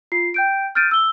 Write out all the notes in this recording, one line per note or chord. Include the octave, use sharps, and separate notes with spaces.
F4 C7
G5 G6 D7
F6 G6 A6 D7 D#7
E6 G7